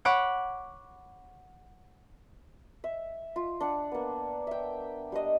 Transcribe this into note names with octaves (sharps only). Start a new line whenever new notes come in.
C#5 F#5 B5 C#6 D6
E5
F4
D4 F#5
A#3 B3
E5 G5
G3 D4 D#5